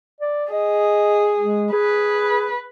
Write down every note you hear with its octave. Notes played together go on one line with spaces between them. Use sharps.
D5
G#4 D#5
G#3
G#4 B4